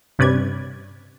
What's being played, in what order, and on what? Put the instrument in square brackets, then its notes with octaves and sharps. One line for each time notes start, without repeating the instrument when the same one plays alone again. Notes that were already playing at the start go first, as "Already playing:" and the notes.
[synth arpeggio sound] G2 C3 C#4 B4 D5 G#6